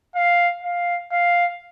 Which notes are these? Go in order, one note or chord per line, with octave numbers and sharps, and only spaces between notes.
F5
F5
F5